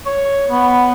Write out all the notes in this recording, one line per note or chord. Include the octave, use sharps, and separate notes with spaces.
C#5
B3